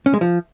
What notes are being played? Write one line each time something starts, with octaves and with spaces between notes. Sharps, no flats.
C#4
G#3
F3